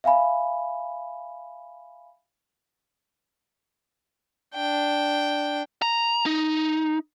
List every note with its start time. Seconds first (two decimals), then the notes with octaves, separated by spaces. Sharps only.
0.04 E5 F5 G#5 B5
4.55 D4 G5
5.82 A#5
6.26 D#4